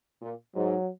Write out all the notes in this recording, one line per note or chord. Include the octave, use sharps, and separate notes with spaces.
A#2
G#2 F#3